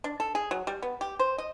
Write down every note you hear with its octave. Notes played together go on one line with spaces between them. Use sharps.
D4
A4
G#4
F#3
G3
B3
G4
C5
D#5